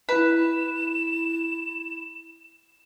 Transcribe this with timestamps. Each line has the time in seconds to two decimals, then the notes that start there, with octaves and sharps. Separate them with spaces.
0.09 E4 B4 B5 E7